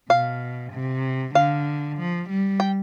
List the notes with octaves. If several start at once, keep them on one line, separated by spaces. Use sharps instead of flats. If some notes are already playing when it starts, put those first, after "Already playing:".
B2 F5
C3
D3 F5
F3
G3
G5